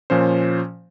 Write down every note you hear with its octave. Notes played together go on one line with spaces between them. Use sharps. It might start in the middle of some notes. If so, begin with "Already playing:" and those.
A#2 F3 C#4 C5